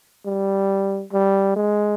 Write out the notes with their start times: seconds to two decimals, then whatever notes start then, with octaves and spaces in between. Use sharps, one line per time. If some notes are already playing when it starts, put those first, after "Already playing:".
0.26 G3
1.12 G3
1.56 G#3